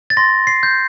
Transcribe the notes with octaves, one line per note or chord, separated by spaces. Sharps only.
A6
C6 A#6
C7
G6